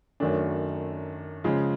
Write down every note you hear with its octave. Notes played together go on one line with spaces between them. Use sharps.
F#2 D#3 F#3 A3 D4
C#3 F3 G#3